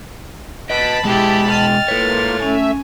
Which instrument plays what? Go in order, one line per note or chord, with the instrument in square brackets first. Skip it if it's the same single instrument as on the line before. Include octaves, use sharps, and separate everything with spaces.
[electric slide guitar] B4 D#5 [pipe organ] A5 B5 [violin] B6 D7
[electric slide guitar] B2 G#3 G#4 [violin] E4 G4
[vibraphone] D#5 G5 [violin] F6 A6
[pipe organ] A#3 F4 [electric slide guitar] A4 C#5 [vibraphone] B4
[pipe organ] A3 E5 [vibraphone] C#4 [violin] G#5